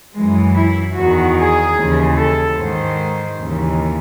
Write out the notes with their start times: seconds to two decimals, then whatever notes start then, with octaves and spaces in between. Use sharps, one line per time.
0.15 F#2 E3 G#3
0.55 E4
0.95 E2 D#3 F#4
1.36 G#4
1.76 D#2 C#3 E3
2.16 A4
2.57 G#2 D#3 C5
3.38 D#2 C#3 E3